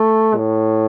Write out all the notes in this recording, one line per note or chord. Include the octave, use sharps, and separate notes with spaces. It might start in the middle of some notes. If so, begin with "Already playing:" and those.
Already playing: A3
A2